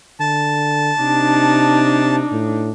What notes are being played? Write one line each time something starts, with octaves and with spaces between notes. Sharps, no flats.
D3 A5
C3 D4 D#4
A2